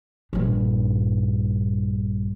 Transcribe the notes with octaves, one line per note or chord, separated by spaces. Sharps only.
A#1 G2